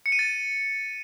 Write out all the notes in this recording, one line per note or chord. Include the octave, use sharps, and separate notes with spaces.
C#7
D#7
A6